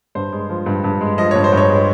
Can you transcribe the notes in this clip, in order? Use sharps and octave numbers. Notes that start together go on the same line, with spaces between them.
G2 C5
G#3
F3
G2
G2
G#3
F3 D#5
G2 C#5
C5
G2 C#5
G#3